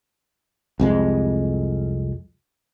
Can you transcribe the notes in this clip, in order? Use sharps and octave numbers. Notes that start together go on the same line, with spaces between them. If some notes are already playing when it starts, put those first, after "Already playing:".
C2 F2 G#3